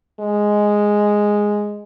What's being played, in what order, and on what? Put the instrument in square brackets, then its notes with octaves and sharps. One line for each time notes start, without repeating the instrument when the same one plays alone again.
[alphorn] G#3